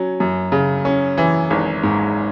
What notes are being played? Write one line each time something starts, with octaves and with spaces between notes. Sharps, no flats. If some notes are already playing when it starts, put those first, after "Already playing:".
Already playing: F#3 C#4
F#2
C#3
C#4
E3
G#1
G#2